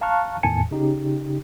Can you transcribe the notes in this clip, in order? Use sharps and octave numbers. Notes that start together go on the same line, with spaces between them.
F5 A5 A#5 C#6 F6 F#6
E2 A2 D#3 G#5 A5 C#7
C#3 D#4 G4